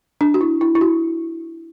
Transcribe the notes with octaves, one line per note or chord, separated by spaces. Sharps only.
D4
F#4
E4
E4
E4
F#4